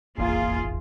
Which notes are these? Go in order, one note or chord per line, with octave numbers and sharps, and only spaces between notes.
D#1 G#1 E2 A#3 F4 G#4